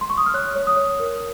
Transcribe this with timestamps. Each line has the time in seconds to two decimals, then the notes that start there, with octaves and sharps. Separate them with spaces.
0.01 C6
0.10 C#6
0.18 D#6
0.26 F6
0.34 C#5 F#6
0.56 C#5
0.67 D#6
0.77 C#5
1.00 A#4